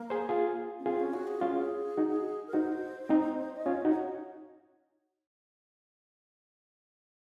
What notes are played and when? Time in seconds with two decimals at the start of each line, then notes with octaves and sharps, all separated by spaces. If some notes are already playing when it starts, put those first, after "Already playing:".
Already playing: A#3
0.10 G#4 C5
0.29 F4 G#4
0.79 C#4
0.85 C4 F4 G#4
1.00 C#4
1.14 F#4
1.27 G#4
1.40 C#4 F4 F#4
1.52 G#4
1.97 D#4 F#4
2.48 A#4
2.53 D#4 F#4 C5
3.09 C4 D#4
3.56 D#5
3.66 C#4 F4 C#5
3.85 D#4 F#4
3.90 C#5